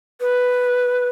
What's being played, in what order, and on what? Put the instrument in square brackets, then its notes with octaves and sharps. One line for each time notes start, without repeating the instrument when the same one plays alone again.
[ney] B4